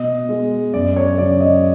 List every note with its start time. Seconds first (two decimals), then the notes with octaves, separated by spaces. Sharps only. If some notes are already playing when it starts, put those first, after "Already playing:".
Already playing: B2 D#5
0.29 G#3
0.74 F#2 D5
0.96 C#5
1.18 C#3 F#3 D5
1.40 D#5